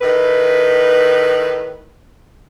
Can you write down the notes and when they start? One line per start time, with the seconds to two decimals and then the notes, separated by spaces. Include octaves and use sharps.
0.02 A2 D#3 B4